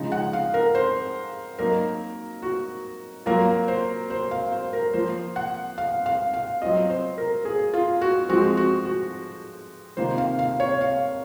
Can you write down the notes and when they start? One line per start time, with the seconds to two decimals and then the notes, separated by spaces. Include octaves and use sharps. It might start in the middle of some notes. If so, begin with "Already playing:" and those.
Already playing: C#3 F3 G#3 D#4
0.12 F#5
0.33 F5
0.54 A#4
0.75 C5
1.59 F#3 A#3 D#4 A#4
2.42 F#4
3.26 F#3 A#3 F4 A#4
3.68 C5
4.10 C5
4.31 F5
4.52 C5
4.73 A#4
4.93 F3 A#3 F4 C5
5.36 F#5
5.78 F5
6.06 F5
6.34 F5
6.62 F#3 C4 F4 D#5
6.90 C5
7.18 A#4
7.45 G#4
7.74 F4
8.01 F#4
8.29 F3 G#3 C4 F#4
8.57 F#4
8.85 F#4
9.97 C3 D#3 A#3 F4 C5
10.18 F5
10.39 F5
10.60 C#5
10.81 F5